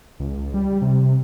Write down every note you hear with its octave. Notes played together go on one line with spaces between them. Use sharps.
C#2
G3
C3